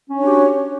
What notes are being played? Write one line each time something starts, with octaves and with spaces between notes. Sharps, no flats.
C#4 D4 F#4 G4 C#5